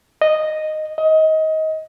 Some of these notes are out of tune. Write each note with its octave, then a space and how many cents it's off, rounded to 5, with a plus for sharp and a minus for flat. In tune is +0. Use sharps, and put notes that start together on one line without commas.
D#5 -10
D#5 +20